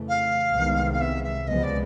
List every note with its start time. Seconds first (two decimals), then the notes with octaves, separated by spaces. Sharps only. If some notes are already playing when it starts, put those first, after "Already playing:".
Already playing: F2 C#3 E3 A3
0.08 F5
0.54 C2 C3 D#3 G#3 B3
0.93 F5
1.00 E5
1.23 E5
1.47 C#2 C3 F3 G#3 B3 D#5
1.63 D5